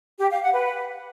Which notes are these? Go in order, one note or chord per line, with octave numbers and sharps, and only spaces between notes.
G4
F5
F#5
B4